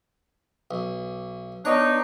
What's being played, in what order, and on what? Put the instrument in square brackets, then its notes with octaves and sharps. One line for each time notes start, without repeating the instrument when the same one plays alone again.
[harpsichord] B1
[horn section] B3 D4 D#4 [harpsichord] C#5